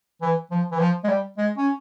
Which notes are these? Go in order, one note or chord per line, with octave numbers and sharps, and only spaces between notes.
E3
F3
E3
F3
G#3
G3
G#3
C#4